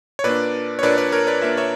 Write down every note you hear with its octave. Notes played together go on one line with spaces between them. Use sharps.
C#5
A#2 A#3 D4 B4 D5
C#5
A#2 A#3 D4 B4 D5
B4 D5
A#4 C#5
B4 D5
A#2 A#3 D4 E5
C#5 E5